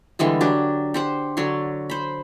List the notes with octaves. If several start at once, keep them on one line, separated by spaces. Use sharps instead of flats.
D3 E3 G3 G#3
F#3 D4 G4
G4 C5 F#5
D3 F#3 C#5 C6
C5 B5